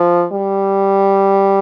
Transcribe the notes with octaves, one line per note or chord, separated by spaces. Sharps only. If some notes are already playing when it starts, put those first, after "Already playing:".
Already playing: F3
G3